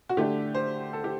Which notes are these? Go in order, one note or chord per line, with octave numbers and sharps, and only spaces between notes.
F#4
D3 A3 D4 G4
C5
A4
G4